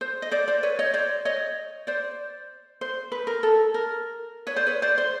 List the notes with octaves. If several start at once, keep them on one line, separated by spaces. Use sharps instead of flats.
C5
D#5
C5 D5
C5 D5
B4 C#5
C#5 D#5
C5 D5
C#5 D#5
C5 D5
C5
B4
A#4
A4
A#4
B4 C#5
C5 D5
B4 C#5
C5 D5
C5